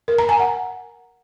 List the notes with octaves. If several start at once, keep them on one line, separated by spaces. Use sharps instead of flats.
A#4
A#5
G#5
F#5